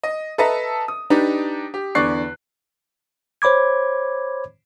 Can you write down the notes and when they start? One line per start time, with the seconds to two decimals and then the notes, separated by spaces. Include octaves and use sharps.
0.03 D#5
0.38 A4 B4 D#5 E5 A5 A#5
0.88 D#6
1.10 D4 D#4 G4 B4
1.74 G4
1.95 E2 D3 D5 C#6 F#6 C7
3.42 C5 C#5 B5 D6 G#6